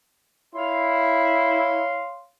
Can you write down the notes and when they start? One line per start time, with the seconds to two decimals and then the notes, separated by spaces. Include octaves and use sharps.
0.55 E4 C#5 F5 C6